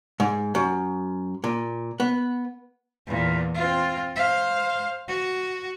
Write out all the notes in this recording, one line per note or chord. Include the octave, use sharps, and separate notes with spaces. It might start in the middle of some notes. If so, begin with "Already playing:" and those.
G#2
F#2
A#2
B3
E2 A#2
C4 F4
C5 F5
F#4